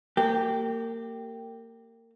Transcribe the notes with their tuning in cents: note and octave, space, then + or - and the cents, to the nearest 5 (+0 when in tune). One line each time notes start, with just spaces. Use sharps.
A#3 -30 G4 +0